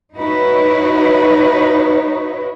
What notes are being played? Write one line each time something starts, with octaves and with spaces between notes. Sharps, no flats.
D#4 E4 F#4 B4 C#5